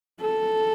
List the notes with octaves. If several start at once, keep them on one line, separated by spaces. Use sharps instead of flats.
A4